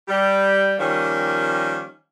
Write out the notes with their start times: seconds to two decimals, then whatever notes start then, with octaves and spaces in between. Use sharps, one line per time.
0.08 G3
0.79 D#3 F3 G3 A#3 C#4